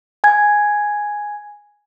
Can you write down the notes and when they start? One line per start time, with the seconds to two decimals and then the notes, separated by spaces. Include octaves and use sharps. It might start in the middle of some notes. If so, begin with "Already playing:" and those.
0.24 G#5 G#6